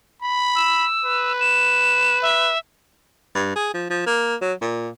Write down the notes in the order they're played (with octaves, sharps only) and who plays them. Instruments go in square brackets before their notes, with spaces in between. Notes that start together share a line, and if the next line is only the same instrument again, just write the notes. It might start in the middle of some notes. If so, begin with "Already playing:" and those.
[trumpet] B5
[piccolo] E6
[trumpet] B4
[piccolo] E7
E5
[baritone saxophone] G2
G#4
F3
F3
A#3
F#3
A#2